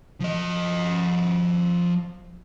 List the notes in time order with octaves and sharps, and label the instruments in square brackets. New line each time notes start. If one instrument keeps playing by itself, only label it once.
[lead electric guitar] F3 D#5